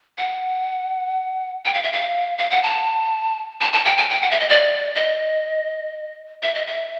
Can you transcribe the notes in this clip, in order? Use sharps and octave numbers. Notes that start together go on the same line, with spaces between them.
F#5
G5
F5
E5
F5
F5
F#5
A5
A5
A5
G5
G#5
G5
F#5
E5
D#5
D5
D#5
E5
D#5
E5